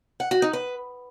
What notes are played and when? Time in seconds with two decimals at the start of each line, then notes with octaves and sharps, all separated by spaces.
0.20 F#5
0.31 F#4
0.42 D#4
0.53 B4